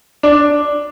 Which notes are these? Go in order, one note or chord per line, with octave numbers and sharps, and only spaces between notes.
D4